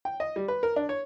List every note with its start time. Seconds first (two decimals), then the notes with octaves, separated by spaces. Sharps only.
0.05 G5
0.20 D#5
0.36 G3
0.48 B4
0.63 A#4
0.76 D4
0.89 C#5